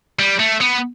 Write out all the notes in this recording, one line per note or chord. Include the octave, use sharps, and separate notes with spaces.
G3
A3
B3